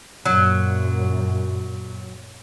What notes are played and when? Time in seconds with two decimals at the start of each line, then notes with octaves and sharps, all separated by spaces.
0.25 F#2 A#2 F#3